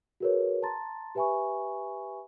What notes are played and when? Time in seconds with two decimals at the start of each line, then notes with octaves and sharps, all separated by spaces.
0.20 F#4 G#4 A#4 B4 C#5
0.63 A5 A#5 C6 A6
1.15 G4 B4 E5 G#5 B5 C#6